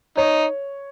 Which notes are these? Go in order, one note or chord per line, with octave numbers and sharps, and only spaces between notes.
D#4 C#5